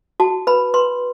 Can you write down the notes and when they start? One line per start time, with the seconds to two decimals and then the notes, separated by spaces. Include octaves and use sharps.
0.20 F#4 A5
0.47 B4 B5
0.74 B4 C6